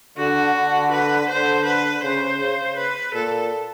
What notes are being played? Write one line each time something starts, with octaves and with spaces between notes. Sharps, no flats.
D3 F#4
D3
B4
D3 C5
B4
C#3 C5
C#3
B4
A#2 A4